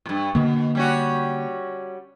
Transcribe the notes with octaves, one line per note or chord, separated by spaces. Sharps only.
G2 A#2
B2 D3 A#3
G3 C#4 F#4